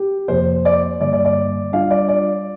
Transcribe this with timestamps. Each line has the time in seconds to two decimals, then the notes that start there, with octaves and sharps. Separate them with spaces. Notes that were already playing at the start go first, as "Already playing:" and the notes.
Already playing: G4
0.28 F2 C3 F3 A#3 C5
0.65 D5
1.01 G2 D3 G3 A#3 D5
1.13 D5
1.25 D5
1.72 G3 D4 F4 F5
1.90 D5
2.09 D5